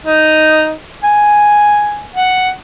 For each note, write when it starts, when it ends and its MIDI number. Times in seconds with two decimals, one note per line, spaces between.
0.06 0.72 63
1.04 2.05 80
2.15 2.49 78